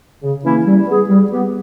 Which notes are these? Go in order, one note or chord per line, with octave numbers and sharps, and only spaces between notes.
C#3
E3 A#3 C#4 E4
G3
B3 E4 G#4
G3
B3 G4